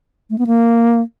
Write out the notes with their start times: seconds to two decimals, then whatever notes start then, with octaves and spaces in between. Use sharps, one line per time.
0.30 A3
0.38 B3
0.47 A#3